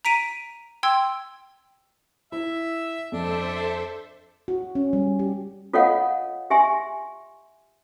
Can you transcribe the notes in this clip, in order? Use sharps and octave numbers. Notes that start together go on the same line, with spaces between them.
A#5 B6 D7 D#7
G5 C6 E6 G#6
E4 E5
F2 D4 A4 C5 E5
F#4
C#4
G3
G4
F4 A4 C#5 D#5 F5 F#5
G4 E5 G#5 C6